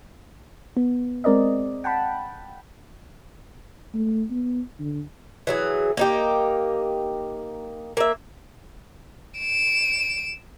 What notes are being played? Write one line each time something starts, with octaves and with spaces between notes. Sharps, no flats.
B3
G#3 C4 A#4 D5 D#5
F#5 G5 A5 B5
A3
B3
D3
E3 F#3 G#4
A#3 D#4 G4
A#3 E5
D7 E7